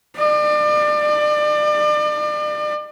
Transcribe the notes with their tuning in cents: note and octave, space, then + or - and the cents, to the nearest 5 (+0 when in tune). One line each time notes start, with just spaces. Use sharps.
D5 +35